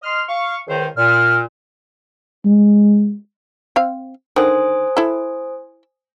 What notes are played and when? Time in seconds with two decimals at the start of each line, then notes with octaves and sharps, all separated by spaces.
0.03 D#5 C6 F6
0.28 F5 C#6
0.68 C#2 D#3 C5
0.97 A#2 F6
2.45 G#3
3.76 C4 F5
4.36 D3 D#3 C5 G#5 D#6
4.97 E4 A4